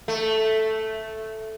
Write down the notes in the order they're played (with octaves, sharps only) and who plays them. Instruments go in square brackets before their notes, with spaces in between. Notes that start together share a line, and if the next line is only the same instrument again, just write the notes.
[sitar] A3